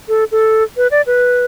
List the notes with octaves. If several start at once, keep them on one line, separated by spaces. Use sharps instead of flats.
A4
A4
B4
D5
B4